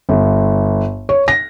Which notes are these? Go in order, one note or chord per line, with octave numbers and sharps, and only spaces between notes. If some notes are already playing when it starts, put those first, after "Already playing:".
G1
C#5
A#6